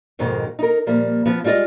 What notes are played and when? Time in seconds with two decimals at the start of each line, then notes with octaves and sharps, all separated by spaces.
0.19 F2 G#2 B2 D#3
0.59 D#4 A#4
0.86 A#2 F3 G3 A#3
1.26 F3 B3 C4
1.44 G3 G#3 F4 C5 D#5